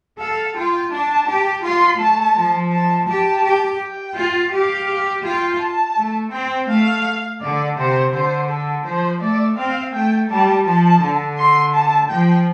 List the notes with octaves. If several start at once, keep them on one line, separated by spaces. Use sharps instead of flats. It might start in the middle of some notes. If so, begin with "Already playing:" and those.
A4 F5
F4 G5
D4 A5
G4
F4 C6
A3 A5
F3
A5
G4 A5
G4
G5
F4
G4 F5
F4 G5
A5
A3
C4 G5
A3 F5
D3 D5
C3 C5
D3 C5
A4
F3 C5
A3 D5
C4 F5
A3 G5
G3 A5
F3 A5
D3
C6
A5
F3 G5